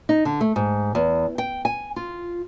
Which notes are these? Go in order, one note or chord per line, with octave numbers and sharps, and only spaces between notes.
D#4
D3
A3
G#2
E2
G5
G#5
F4